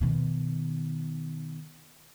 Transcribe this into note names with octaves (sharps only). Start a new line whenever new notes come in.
B2 D#3